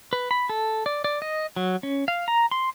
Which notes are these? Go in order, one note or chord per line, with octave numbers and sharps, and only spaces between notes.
B4
B5
A4
D5
D5
D#5
F#3
C#4
F5
A#5
C6